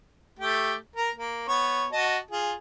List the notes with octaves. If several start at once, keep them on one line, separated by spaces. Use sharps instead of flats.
A3 G4
A#4
A#3
B3 C#5
F#4 D#5 A5
F4 G#4